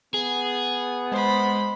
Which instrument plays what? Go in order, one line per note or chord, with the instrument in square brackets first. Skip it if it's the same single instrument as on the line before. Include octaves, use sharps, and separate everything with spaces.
[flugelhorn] B3 [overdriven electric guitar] G#4
[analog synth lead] G#3 [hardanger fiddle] C5 B5